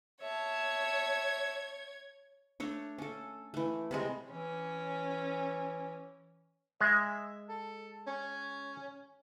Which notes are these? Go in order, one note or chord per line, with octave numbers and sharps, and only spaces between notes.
C#5 E5 A5 G#6
A3 D4 C#5
C#4 A4
E3 A3
C3 G3 G#3
E3 C#4
G#3 E5
A4
C#4